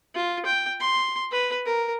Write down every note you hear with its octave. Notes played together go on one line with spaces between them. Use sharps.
F4
G5
C6
B4
A#4